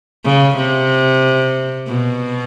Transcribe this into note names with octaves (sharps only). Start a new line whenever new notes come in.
C#3
C3
B2